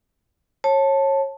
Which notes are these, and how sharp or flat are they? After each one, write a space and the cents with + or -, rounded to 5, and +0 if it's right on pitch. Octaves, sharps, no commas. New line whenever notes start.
C#5 -25 A5 +0